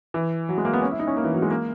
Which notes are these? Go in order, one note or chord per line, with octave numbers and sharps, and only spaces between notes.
E3
F#3
G#3
A#3
B3
C#4
E4
D#4
C#4
A#3
E3
F#3
G#3
A#3